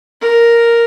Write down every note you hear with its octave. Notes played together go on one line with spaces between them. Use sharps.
A#4